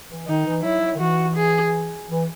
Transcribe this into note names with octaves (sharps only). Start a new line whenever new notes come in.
E3
D#3 D#4
E3
F#3 E4
F#3
D#3
E3 F#4
G#4
E3